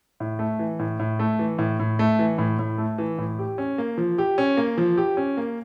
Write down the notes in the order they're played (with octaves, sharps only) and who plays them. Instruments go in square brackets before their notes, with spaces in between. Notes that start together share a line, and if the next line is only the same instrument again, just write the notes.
[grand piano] A2
A3
E3
A2
A2
A3
E3
A2
A2
A3
E3
A2
A2
A3
E3
A2
G4
C#4
A#3
F3
G4
C#4
A#3
F3
G4
C#4
A#3